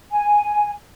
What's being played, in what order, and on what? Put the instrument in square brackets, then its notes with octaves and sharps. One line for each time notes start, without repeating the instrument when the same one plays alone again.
[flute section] G#5